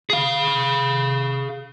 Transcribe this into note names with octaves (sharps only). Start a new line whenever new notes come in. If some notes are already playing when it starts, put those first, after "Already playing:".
G#4 F5